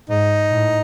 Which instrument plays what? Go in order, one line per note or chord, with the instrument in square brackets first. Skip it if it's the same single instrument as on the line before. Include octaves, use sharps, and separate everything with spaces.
[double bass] G#2 [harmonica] D#4
[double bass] A2